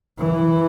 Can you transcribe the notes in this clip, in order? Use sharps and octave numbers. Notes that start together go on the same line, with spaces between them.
E3